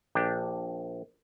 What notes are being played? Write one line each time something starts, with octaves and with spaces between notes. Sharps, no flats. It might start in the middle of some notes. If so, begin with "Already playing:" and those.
A#1 D4 G4